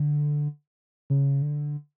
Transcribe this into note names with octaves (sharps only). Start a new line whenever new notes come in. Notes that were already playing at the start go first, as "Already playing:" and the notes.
Already playing: D3
C#3
D3